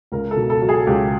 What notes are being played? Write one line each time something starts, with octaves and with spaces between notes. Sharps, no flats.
C#2 A#4
A4
B2
A4
F#3
G#4
C#2 G4